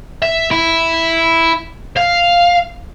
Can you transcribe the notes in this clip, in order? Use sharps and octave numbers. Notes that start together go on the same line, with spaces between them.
E5
E4
F5